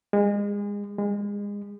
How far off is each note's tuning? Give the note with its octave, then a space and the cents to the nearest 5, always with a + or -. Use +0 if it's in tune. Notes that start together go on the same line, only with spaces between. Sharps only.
G#3 -30
G#3 -30